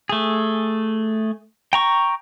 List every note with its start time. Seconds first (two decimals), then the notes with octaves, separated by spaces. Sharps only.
0.09 A3 G#4
1.73 G5 A#5 C#6